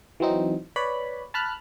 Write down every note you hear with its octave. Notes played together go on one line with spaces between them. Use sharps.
E3 F#3 C4 D#4
B4 C#5 D5 B5
A5 B5 F6 F#6